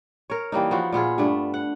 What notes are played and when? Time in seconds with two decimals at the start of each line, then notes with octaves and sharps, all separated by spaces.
0.30 A#4 C#5
0.52 E3 G3 A#3 D#4
0.71 F3 B3 F#4
0.93 A#2 B3 F4 G#4
1.18 G2 A3 D4
1.54 F#5